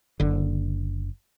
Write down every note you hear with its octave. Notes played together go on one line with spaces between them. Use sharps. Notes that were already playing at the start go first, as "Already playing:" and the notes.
F#1 D3